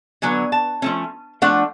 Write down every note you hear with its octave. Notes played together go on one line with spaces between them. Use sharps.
D3 F#3 B3 G#5
A5
F3 A3 C#4
F3 A3 D4 F#5